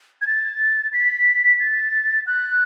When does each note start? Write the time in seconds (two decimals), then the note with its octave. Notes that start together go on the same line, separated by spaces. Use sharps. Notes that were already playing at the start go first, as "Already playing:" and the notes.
0.21 G#6
0.27 A6
0.93 B6
1.60 A6
2.27 F#6